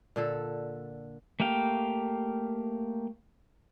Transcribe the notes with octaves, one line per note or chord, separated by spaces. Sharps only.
A#2 D3 A4
A3 A#3 G4 F5 G5